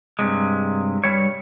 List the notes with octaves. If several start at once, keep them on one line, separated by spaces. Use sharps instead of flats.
G2 C3 G#3
G2 C#3 G3 C#5